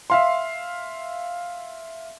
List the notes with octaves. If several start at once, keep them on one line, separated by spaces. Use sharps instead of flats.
E5 F5 C6